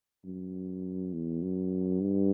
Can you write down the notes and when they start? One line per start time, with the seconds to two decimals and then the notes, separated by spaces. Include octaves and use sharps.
0.25 F#2
1.13 E2
1.42 F#2
2.01 G2